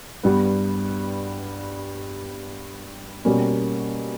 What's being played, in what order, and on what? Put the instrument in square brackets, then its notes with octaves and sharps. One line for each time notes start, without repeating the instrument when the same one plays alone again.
[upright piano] G2 G3 B3
B2 G3 A#3 C#4